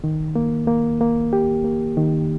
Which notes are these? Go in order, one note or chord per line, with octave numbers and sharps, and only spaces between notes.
D#3
A#3
A#3
A#3
G4
A#3
D#3